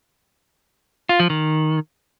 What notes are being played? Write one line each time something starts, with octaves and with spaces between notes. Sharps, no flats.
F4
F3
D#3